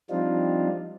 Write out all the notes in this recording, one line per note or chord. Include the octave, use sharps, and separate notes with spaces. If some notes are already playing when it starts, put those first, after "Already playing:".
F3 G3 C4 D4 D#4 F4